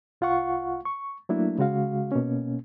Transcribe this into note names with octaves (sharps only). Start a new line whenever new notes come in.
C2 F4 F5 F#5 C#6
C#6
F#3 A3 A#3 D4 E4
C#3 G#3 F#4 F5
B2 A#3 C#4